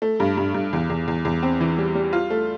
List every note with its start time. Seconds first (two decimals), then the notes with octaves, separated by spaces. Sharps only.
0.02 A3
0.20 G2
0.37 G2
0.54 G2
0.73 E2
0.90 E2
1.08 E2
1.25 E2
1.43 C4
1.61 E3
1.78 G3
1.95 G3
2.13 F4
2.30 A3